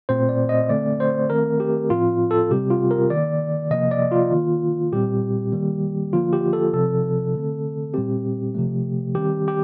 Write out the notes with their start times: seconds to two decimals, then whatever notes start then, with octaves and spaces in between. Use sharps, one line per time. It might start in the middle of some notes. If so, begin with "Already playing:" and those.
0.09 A#2 A3 C4 C5
0.29 D5
0.49 D#5
0.69 D3 A3 C4 D5
1.00 C5
1.30 D#3 A3 C4 A#4
1.60 G4
1.90 A2 F3 C4 F4
2.31 A4
2.51 C3 G3 C4 G4
2.70 F4
2.91 A#4
3.10 D#3 A#3 D5
3.71 C3 F3 A#3 D#5
3.91 D5
4.11 F4
4.32 D#3 A#3
4.93 A#2 G3 C4 G4
5.52 D#3 G3 A#3
6.13 D3 F3 A#3 F4
6.33 G4
6.53 A4
6.73 C3 F3 C4 A4
7.34 D3 A3 C4
7.94 A#2 G3 C4 G4
8.55 C3 F3 A3
9.15 D#3 G3 C4 G4
9.48 G4